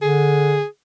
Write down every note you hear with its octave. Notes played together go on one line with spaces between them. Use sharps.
D3 G#4